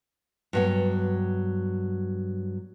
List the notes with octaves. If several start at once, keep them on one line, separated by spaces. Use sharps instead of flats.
G2 F#3 B3